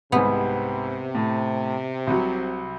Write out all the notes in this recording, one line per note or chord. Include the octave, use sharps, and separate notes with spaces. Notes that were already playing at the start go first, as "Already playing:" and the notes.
C2 G#2 C3 B3
A2
C2 F#3